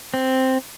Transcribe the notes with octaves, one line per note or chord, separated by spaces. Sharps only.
C4